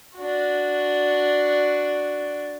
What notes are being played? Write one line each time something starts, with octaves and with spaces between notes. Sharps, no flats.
D4 F#4